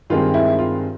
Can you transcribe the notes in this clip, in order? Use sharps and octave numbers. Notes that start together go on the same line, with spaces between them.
G2 D#3 G#3 C4 F4
E4
F4